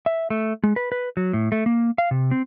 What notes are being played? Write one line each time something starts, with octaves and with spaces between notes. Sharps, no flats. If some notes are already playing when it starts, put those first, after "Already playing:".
E5
A3
G#3
B4
B4
F#3
A2
A3
A#3
F5
C3
C4